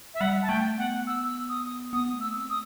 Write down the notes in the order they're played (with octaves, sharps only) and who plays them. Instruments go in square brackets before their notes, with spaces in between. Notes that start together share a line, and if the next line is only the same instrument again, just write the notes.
[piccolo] E5
[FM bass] G3 [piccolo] F#5
[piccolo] A5
[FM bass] A3 [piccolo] G5
[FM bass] B3 [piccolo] F#5
[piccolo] E6
D#6
[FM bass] B3 [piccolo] D#6
[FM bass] A3
[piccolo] E6
[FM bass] C4
[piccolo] D#6